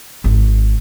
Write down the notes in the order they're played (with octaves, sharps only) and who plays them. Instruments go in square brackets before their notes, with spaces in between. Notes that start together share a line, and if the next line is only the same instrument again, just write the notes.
[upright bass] G#1